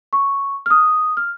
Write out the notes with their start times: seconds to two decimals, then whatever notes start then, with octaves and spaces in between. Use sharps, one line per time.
0.13 C#6
0.66 F6
0.70 D#6
1.17 F6